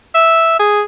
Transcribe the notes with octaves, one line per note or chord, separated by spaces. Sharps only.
E5
G#4